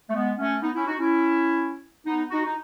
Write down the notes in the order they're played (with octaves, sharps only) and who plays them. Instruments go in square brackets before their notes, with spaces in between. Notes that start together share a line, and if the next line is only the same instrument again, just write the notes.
[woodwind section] A3
G#3 B3
A3 C#4
B3 D#4
C#4 E4
D#4 F#4
C#4 E4
B3 D#4
D#4 F#4
D#4